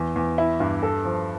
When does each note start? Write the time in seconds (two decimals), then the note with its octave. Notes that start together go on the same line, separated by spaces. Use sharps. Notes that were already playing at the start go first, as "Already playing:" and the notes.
Already playing: E2
0.16 E2
0.38 E4
0.60 G2
0.83 A4
1.05 F3